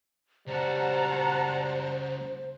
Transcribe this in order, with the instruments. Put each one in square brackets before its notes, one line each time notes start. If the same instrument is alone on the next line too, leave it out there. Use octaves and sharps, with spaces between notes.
[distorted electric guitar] C#2 F#4 [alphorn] G3 [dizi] C5 [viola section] F#5 A5 A#5